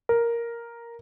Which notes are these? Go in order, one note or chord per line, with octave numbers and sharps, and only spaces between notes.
A#4